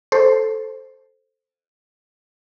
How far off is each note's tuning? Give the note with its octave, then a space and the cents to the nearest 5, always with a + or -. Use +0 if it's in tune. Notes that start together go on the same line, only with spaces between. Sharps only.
A4 +0 C5 +0